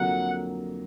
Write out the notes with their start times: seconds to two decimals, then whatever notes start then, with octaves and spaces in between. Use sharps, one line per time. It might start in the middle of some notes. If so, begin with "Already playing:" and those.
Already playing: F2 D3 F#3 A#3 F#5